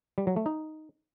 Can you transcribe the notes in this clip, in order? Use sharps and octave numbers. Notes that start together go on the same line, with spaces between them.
G3
F#3
A3
D#4